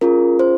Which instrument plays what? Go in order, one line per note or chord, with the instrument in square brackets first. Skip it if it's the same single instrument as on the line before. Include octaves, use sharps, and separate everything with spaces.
[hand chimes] C#4 F4 G#4 A#4
C5